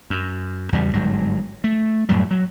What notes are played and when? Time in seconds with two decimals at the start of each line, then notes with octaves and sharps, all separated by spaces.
0.10 F#2
0.72 E2 C#3 G3
0.93 G1 G#2 F#3
1.64 A3
2.09 F#2 A2 F#3 G3
2.31 F#3